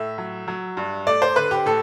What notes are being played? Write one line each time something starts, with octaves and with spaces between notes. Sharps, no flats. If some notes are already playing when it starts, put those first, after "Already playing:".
Already playing: A2 E5
F#3
F#3
G2
A3 D5
C5
D3 B4
G4
A2 A4